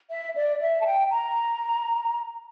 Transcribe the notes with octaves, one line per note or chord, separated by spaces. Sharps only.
E5
D5
E5
A5
G5
A#5